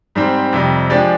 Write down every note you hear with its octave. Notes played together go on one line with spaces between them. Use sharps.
G#2 G3 C4 G4
F2 C3 G3
F3 G#3 D4 G4 D5